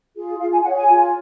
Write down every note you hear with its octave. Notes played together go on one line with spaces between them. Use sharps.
F4 G#4
F4 F5
G#5
G#4 C#5 F#5
G#5
F4